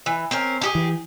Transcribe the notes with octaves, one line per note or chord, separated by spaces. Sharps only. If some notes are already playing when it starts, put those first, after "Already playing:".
E3
C4 C#4 A#4
D4 G4 G#4
E3